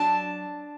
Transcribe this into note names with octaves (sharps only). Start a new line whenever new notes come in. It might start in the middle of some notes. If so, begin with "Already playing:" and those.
Already playing: F#3 D4 A5